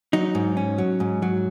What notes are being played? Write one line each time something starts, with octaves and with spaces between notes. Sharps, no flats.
F#3 D#4
G#2
C#4
F#3
G#2
F#3